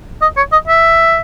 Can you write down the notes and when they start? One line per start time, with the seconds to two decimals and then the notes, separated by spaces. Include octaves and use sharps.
0.22 D#5
0.37 C#5
0.52 D#5
0.67 E5